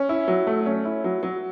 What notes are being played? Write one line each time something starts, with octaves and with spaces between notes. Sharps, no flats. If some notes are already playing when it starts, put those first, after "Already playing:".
Already playing: C#4
E4
F#3
A3
C#4
E4
F#3
F#3